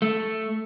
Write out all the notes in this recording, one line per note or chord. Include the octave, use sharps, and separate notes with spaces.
A3